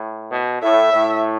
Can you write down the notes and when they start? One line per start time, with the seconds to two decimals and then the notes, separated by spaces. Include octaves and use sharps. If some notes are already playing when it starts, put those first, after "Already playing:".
Already playing: A2
0.32 B2
0.62 A2 E5
0.93 A2